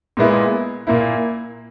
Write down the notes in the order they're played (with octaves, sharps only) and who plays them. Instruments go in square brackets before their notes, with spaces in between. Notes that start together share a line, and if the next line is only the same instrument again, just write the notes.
[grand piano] A#2 G#3 B3 E4
A#2 A#3 E4